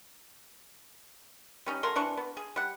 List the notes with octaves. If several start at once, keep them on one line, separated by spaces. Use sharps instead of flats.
G3 C#4 D#4
F#3 A3 A#4 C6
C3 E3 D4 C#6
B3
G#4
G3 F#5